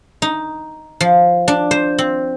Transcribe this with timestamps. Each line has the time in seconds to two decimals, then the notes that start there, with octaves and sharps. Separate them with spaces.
0.22 D#4
1.01 F3
1.48 D4
1.71 C5
1.98 C4